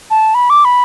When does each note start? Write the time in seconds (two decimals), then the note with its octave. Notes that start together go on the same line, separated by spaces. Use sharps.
0.10 A5
0.34 B5
0.50 D6
0.65 B5